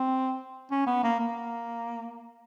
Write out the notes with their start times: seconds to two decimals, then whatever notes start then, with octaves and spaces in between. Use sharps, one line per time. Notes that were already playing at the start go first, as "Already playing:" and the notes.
Already playing: C4
0.71 C#4
0.87 B3
1.03 A#3
1.20 A#3